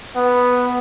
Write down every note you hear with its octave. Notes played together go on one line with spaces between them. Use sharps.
B3